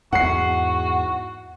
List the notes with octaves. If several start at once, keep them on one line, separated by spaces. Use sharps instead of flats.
E2 G#2 F#4 F#5 C7